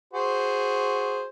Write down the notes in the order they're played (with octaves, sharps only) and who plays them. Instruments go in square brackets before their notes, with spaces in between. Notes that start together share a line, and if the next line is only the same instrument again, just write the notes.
[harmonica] F#4 G#4 C5